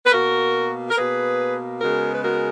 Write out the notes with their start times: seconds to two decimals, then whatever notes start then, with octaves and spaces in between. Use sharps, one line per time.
0.05 B4
0.12 B2 A#3 F#4 A#4
0.90 A#4
0.97 B2 A#3 G#4 B4
1.81 C#3 G#3 B3 F#4 A#4
2.14 B4
2.23 F#4 A#4